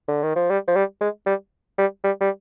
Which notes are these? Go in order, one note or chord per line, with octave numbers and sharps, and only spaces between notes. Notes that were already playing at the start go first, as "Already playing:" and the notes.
D3
D#3
F3
G3
F3
G3
G#3
G3
G3
G3
G3